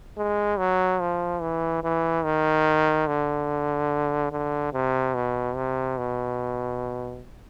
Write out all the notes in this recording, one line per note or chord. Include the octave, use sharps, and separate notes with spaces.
G#3
F#3
F3
E3
E3
D#3
D3
D3
C3
B2
C3
B2